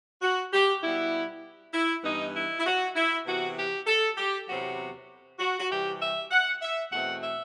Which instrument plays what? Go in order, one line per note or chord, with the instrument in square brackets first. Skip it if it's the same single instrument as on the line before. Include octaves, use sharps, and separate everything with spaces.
[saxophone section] F#4
G4
B2 G3 B3 E4
E4
G2 E3 B3 D#4
E4
E4
F#4
E4
C3 E3 B3 F#4
G4
A4
G4
E2 C3 F#3 B3 F#4
F#4
F#4
C3 E3 G3 G4
E5
F#5
E5
E2 B2 A3 C4 F#5
E5